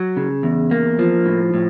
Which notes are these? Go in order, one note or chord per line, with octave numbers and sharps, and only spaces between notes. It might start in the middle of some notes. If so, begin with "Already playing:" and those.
Already playing: F#3
C#3
E2
A#3
F3
A2
A2